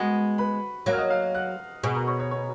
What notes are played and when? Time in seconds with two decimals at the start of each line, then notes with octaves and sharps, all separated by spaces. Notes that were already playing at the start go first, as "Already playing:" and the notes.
Already playing: G#3 B3 F#4 F#5
0.38 B4 B5
0.86 F#3 A#3
0.93 F6
0.98 D#5 D#6
1.10 F5 F6
1.35 F#5 F#6
1.83 B2 G#4 G#5
1.95 A#4 A#5
2.07 C#5 C#6
2.20 C#5 C#6
2.31 C#5 C#6